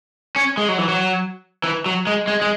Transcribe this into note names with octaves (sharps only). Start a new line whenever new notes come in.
C#4
G#3
F#3
E3
F#3
E3
F#3
G#3
G#3
G#3